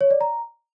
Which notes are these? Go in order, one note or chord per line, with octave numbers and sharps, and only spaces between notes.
C#5
D5
A#5